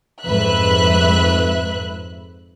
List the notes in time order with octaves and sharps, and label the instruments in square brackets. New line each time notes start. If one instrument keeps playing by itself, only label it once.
[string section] F2 G#2 B4 E5 F#6